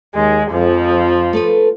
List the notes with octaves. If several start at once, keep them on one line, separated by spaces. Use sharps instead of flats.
D#2 G#3
F2 F3
A3 A4 B4